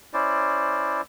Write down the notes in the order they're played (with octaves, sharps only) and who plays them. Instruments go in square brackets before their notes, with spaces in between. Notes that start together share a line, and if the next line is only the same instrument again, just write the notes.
[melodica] C#4 E4 C5 D5